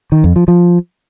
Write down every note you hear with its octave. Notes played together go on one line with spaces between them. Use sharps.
D#3
F2
F3
F3